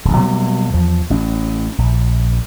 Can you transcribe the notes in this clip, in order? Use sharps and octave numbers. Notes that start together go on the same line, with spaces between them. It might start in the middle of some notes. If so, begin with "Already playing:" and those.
D1 A#1
B2 F#3 G3 A#3
E2 F3
A1 C#4
A#1